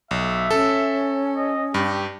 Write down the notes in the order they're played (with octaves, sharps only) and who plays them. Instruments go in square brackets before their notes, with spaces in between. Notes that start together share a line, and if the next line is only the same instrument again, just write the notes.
[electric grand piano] B1 [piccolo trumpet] E5
[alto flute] C#4 [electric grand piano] A4
[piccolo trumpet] D#5
[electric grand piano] G2 [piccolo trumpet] G4